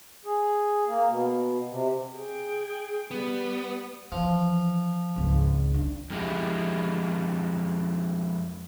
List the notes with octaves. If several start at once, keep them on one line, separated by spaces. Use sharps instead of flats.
G#4
A#3
B2
C3
G#4 G5
G3 B3
E3 F3
G#1 C#2
D4
F2 G#3 E4 G4